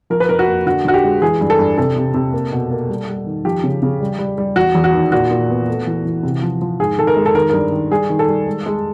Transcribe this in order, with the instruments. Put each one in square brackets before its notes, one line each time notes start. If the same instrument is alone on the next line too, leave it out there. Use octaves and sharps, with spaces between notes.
[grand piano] F3 A#4
B4
F2 A#4
F#4
A#3
D3 F#4
D3 F#4
G4
G#3
E3 G#4
G2
A4
G2
C3 A4
C3
C3
A#3
B2
A#3
G3
G3
D#3
F3 G4
C#3
C#3
G3
G3
G3
E2 F#4
E2
F#4
D#3
A#2 F#4
A#2
B3
A3
E3
E3
C3
F3
F3
G#2 G#4
D#3 A4
A#4
G#3
A4
D#3 A#4
G2 A#4
D#3
G3 G#4
D#3
A4
G3
G#3
G#3